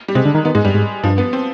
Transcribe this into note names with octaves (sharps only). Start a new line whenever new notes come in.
G3
C3 G#3
D3
D#3
D#3 B3
G#2 G#3
G2 G3
G#2
G2 F3
B3
C4